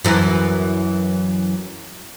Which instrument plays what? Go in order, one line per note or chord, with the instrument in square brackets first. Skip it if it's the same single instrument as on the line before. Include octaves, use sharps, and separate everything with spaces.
[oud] F#2 E3